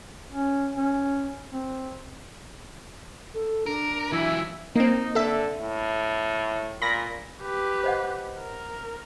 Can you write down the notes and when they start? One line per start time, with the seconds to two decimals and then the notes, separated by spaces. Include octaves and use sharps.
0.32 C#4
0.77 C#4
1.52 C4
3.34 A4
3.66 D4 A#4
4.12 E3 F#3 E4
4.76 A#3 C4 D#4
5.15 D3 A4 E5
5.60 A2
6.82 A#2 B5 A#6
7.42 G4 B4
7.84 C5 D#5 F#5
8.39 A#4